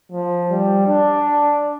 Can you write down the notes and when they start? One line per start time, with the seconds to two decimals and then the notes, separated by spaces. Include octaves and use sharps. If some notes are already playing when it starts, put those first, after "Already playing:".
0.12 F3
0.50 G3
0.87 D4